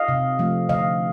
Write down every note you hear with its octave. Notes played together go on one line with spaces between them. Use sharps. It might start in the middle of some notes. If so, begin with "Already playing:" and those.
Already playing: D#5 F5
C3
F3 A3
D3 D#5 F5